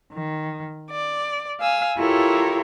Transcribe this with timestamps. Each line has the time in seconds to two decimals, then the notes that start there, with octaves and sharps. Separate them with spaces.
0.11 D#3
0.91 D5
1.61 F5 G#5 E6
1.98 E4 F4 G4 A4 A#4 C#5